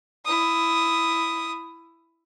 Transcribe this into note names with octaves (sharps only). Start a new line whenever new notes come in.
E4 D#6